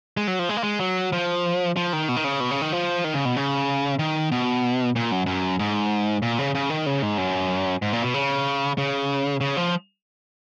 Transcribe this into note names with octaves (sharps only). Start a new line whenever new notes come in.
G#3
F#3
F3
G#3
A#3
G#3
F#3
F3
F3
D#3
B2
D#3
C#3
B2
C#3
D#3
F3
D#3
C#3
B2
C#3
D#3
B2
A#2
F#2
F#2
G#2
A#2
C#3
C#3
D#3
C#3
G#2
F#2
G#2
A#2
B2
C#3
C#3
C#3
F3